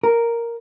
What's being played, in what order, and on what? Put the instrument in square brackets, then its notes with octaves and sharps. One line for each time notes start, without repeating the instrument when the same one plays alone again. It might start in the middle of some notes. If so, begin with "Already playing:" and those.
[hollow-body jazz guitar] A#4